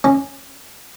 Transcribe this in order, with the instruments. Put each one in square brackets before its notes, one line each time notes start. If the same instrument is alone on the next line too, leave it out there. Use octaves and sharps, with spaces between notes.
[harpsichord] C#4